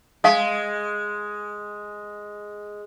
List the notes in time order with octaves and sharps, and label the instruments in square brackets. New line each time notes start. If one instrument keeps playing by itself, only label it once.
[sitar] G#3 [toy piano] F5 D#6